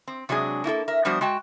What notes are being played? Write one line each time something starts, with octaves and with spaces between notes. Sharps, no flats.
C4
C3 F#3 G#3 D4 G#4
A#3 E4 F4 A4
A#4 E5
F3 G3 B3 D4 F#4 C5
G#3 F#4 G5 A5